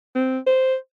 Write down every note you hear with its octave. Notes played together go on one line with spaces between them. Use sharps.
C4
C5